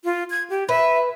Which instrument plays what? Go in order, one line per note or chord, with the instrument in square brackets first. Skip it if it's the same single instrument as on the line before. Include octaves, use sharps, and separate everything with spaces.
[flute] F4
G#6
G4
[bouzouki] B4 [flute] E5